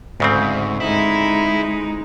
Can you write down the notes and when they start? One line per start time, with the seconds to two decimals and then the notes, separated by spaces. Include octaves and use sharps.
0.20 D2 G#2 C#3 C4
0.80 G#3 D#4 E4